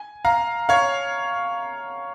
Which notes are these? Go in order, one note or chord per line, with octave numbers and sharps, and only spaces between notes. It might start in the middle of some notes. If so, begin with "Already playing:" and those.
Already playing: G#5
F5 A#5
C#5 F5